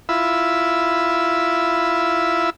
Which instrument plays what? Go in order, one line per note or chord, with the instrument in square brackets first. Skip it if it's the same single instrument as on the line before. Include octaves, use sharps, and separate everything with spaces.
[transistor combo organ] E4 F4 B5 E6